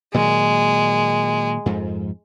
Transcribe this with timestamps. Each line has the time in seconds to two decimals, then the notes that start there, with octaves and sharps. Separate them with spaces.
0.14 A#2 D#3 F#3 G#3
1.66 F2 G#2